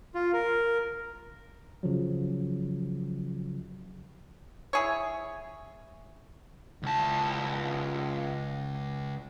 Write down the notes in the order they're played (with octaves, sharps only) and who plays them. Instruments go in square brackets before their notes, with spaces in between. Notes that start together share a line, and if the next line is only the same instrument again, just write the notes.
[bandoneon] F4
A#4
[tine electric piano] C#3 F3 F#3
[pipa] E4 G#4 C#5
[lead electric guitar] C#2 A5